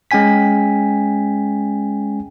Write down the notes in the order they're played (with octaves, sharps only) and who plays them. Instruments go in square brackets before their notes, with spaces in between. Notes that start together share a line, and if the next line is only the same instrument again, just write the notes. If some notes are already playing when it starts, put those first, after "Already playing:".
[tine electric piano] G#3 C#4 G5 G#5 B6